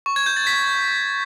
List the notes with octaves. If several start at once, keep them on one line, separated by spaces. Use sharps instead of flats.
C#6
G#6
G6
A6
B6